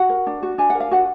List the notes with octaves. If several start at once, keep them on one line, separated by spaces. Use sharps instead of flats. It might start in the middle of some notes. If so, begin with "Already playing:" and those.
Already playing: F#4 F#5
A#4
D4
F#4
D4 G#5
A#4 F#5
F5
D4 F#4 F#5